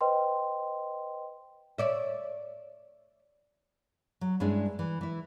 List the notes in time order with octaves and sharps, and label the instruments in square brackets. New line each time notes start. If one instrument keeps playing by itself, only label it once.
[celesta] B4 C5 D#5 G5 C6
[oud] C#5 D5 E5
[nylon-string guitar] F#3
G2 G#3 C#4 D4 E4
E3
E3 E4